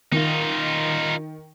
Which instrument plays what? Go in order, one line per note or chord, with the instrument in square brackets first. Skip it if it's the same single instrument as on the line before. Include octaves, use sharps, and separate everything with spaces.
[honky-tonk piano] D#3 [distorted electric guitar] D#4 F4